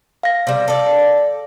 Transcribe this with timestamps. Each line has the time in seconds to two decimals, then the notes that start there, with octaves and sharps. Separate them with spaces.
0.23 F5 A#6
0.47 C3 G3
0.68 A4 D5